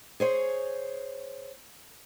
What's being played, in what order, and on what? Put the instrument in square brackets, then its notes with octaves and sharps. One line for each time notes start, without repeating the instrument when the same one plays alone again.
[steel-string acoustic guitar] G#4 C5 C#5